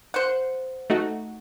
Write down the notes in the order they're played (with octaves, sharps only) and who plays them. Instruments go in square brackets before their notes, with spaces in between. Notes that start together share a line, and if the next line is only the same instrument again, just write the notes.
[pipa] C5 F#5
[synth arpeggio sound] A3 D#4 F#4